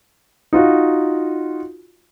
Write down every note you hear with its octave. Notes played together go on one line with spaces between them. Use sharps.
D#4 F4 F#4